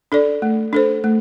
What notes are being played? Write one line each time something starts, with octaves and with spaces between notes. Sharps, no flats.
D4 A4 D5
A3
D4 A4 C5
A3